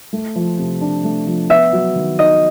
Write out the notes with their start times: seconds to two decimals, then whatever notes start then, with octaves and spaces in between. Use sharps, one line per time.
0.13 A3
0.36 F3
0.59 C3
0.81 D4
1.04 A3
1.27 F3
1.50 B3 E5
1.73 F#3
1.96 D#3
2.19 D#4 D#5